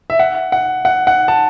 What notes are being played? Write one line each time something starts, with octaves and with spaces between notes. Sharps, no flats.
E5
F#5
F#5
F#5
F#5
A5